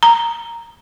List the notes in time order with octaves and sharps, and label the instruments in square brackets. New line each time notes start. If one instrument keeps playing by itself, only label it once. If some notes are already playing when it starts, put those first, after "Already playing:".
[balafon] A#5